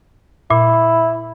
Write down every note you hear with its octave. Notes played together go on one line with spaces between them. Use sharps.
A#2 E4